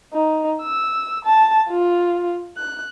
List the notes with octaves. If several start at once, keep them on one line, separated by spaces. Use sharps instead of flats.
D#4
E6
A5
F4
F#6